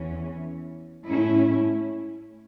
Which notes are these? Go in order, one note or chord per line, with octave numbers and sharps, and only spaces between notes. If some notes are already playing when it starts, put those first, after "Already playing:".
Already playing: E2 E3 C#4
A2 A3 C#4 E4